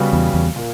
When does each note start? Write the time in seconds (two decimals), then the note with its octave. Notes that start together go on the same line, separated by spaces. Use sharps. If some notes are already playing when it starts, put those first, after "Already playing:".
Already playing: C#3 G3 B3 F#4 B4
0.13 E2
0.34 E2
0.56 A#2 A#3